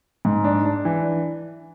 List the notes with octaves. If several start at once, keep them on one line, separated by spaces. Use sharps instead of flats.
G#2
D4
D4
E3